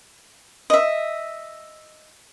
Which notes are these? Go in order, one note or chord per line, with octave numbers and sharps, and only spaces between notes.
D#5 E5